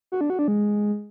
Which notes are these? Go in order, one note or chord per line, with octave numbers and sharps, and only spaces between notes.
F#4
D4
F#4
D4
G#3